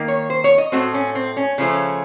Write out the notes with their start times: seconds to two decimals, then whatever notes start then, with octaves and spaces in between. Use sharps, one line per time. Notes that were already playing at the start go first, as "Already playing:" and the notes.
Already playing: D#3 A#3
0.08 C#5
0.30 C5
0.44 C#5
0.58 D#5
0.72 A2 A3 C4 F#4
0.94 C#4
1.15 C4
1.37 C#4
1.58 C#3 F3 A3 C#4